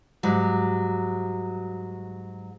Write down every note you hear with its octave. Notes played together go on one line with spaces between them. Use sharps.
G#2 F#3 G3